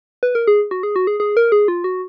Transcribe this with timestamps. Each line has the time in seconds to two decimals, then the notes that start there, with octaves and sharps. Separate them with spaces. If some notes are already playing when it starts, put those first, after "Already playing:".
0.23 B4
0.35 A#4
0.47 G#4
0.71 F#4
0.83 G#4
0.96 F#4
1.07 G#4
1.20 G#4
1.37 A#4
1.52 G#4
1.68 F4
1.84 F#4